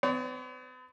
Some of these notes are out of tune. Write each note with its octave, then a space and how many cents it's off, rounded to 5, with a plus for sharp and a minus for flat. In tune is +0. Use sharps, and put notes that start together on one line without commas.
B3 +45 C#5 +40